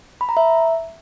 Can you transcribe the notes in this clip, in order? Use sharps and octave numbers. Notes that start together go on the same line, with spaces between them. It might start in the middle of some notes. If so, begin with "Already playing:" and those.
B5
A#5
E5